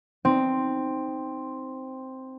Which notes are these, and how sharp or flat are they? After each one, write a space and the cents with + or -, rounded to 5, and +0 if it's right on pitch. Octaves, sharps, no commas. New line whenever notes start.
C4 +0 D#4 +0